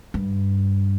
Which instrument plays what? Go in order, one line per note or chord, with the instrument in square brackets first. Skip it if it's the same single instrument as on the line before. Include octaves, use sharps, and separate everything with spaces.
[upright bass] G2